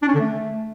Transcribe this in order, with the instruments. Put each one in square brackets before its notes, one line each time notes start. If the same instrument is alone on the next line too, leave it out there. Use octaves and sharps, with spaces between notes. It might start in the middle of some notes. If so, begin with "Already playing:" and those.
[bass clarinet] D4
C#4
D3
A3